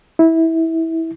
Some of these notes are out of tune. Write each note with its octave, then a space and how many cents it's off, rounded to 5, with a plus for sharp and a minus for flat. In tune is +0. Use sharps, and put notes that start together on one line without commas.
E4 -20